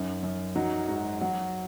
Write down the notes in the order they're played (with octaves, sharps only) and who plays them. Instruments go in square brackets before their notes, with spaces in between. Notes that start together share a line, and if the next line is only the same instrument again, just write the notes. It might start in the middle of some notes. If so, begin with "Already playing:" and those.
Already playing: [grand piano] F#2 D#4
F#2
F#3 D#4
G#2 F#4
F#3 F#4